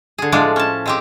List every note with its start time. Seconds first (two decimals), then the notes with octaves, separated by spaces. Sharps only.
0.18 D3 G#4
0.32 A2 F3 G#3 D4 D5
0.56 C#4 A5
0.86 G#3 C4 G4